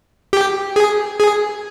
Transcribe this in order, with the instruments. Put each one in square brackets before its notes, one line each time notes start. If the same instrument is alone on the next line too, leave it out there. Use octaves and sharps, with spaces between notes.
[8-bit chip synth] G4
G#4
G#4